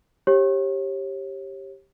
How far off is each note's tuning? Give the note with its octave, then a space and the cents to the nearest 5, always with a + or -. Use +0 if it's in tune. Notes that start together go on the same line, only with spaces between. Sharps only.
G4 +0 C#5 -35